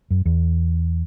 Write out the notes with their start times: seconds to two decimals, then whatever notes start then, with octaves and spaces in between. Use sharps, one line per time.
0.11 F#2
0.26 E2